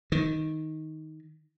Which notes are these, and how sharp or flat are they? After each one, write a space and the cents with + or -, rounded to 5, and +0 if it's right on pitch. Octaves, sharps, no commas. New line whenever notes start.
D#3 +10